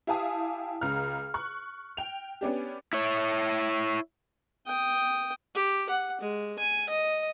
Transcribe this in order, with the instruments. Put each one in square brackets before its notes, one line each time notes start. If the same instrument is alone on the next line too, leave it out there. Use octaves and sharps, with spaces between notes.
[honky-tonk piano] E4 G4 F5 G#5 A5 D#6
C#2 C#3 A#5 F6
C#6 F#6
G5 F7
B3 C#4 D4 G4
[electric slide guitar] E4 C#5
[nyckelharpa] G5 D#6
G4
F#5
G#3
G#5
D#5